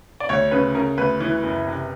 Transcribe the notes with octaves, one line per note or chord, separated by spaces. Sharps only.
D5
D2 C#5
C#3 B4
C#3 A#4
D2 B4
E3
F#1
C3